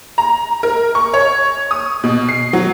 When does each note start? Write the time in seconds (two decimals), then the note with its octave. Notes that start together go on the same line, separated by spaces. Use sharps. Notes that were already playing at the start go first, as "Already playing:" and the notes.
0.18 A#5
0.63 A#4
0.95 C#6
1.14 C#5
1.71 D#6
2.04 B2
2.29 C7
2.53 F#3